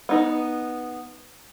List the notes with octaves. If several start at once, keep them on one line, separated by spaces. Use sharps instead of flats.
B3 D#4 B4